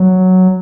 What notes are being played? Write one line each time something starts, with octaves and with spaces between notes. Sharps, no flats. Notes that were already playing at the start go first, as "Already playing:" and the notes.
Already playing: F#3